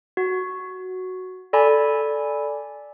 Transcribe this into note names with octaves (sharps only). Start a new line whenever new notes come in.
F#4
A4 D5 G#5 B5